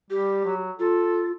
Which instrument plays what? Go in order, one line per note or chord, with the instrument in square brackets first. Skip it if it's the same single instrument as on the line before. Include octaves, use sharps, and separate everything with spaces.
[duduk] G3 [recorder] G4
[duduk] F#3
[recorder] F4 [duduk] A4